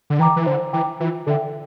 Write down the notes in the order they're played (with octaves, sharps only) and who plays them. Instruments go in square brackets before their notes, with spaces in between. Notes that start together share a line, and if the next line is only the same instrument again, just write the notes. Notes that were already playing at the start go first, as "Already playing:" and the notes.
[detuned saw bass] D3
[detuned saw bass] E3 [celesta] G5 A#5 D6
[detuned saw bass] E3
[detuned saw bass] D3 [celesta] C5
[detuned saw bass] E3 [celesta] G5 A#5 D6
[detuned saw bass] E3 [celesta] F4
[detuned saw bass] D3 [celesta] A4 E5 G5